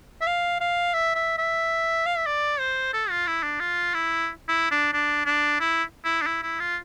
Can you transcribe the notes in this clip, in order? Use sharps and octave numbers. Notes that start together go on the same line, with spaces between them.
E5
F5
F5
E5
E5
E5
F5
E5
D5
C5
A4
F4
E4
D4
F4
E4
E4
D4
D4
D4
E4
E4
D4
E4
E4
F4